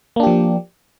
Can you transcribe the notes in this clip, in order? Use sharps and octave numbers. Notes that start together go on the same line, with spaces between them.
F3 A#3 D4 G4